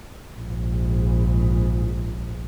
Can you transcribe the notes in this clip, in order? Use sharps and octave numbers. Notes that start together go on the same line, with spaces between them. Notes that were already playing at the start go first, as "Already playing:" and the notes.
A#1 G#2